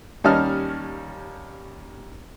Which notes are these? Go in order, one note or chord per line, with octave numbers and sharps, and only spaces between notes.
D#2 G3 C#4 D#5 A5 F6